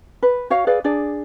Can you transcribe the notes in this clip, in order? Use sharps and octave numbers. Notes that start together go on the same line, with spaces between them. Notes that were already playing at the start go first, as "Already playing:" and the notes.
B4
F#4 C#5 F5
G#4 B4 D5 F5
D4 G#4 D5